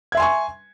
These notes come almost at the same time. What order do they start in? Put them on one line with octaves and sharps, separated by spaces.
G#6 E5 C6 G#5 C#6